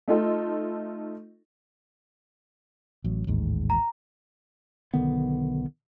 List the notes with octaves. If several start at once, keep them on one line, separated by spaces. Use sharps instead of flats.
A3 D#4 F4 A4
A1 F#3
A1 D#2 G#2
A#5
B1 D3 D#3 B3